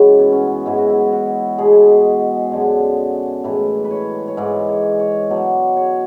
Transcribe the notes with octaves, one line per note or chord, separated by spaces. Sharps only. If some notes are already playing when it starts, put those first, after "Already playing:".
Already playing: F#2 C#3 E3 G#3
B3
C#4
B3
G#2 E3 G#3 E4
F#4
E4
F#4
B2 G#3 G#4
F#2 D3 G#3
A2 E3 G#3 B4
B4
C#5
C#5
G#2 E3 G#3 D5
C#5
C#5
B2 F#3 D5
C#5